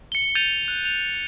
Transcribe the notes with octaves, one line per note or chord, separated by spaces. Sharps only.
C#7 G7
G6 A6 D#7 F7 G7
F#6
F7